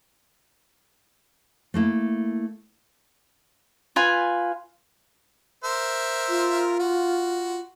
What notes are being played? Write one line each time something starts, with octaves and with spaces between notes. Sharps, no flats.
A3 A#3 E4
F4 B4 G#5
A#4 C5 E5
F4
F#4